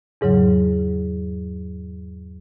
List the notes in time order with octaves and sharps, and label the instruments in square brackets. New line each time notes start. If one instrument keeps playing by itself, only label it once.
[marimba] E2 G#2 C#3 F#3